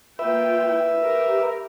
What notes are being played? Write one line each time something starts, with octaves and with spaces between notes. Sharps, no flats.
A#3 F4 B4 E5 G5
E4
G4 A#4